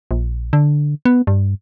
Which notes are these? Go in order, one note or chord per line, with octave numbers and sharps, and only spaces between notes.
A#1
D3
B3
G2